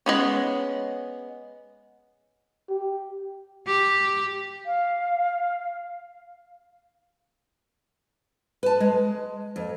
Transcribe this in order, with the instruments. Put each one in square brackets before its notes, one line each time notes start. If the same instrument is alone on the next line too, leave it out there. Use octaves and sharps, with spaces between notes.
[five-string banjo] G#3 B3 C#4
[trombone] G4
[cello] G4
[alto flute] F5
[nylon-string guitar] B4 A5
G#3
F2